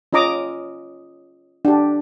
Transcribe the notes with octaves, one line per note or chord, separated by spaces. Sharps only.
C#4 F4 D#5 A#5 D6 D#6
D4 G4